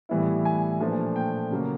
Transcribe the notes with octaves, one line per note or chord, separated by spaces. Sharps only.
A2 E3 G3 B3 E4
G#5
A#2 F3 A3 D4
G5
C#3 F#3 A#3